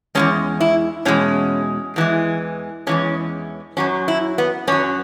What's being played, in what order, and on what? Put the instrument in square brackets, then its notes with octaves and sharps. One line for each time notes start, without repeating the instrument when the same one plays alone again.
[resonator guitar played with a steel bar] E2 B2 G#3 C#4
E4
E2 B2 G#3 C#4
E2 E3 G#3
E2 E3 G#3 C#4
F#2 F#3 C#4
E4
B3
F#2 F#3 C#4